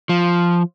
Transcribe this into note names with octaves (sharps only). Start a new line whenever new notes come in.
F3